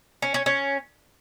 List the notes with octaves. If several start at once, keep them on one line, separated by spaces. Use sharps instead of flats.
C#4
C#4
C#4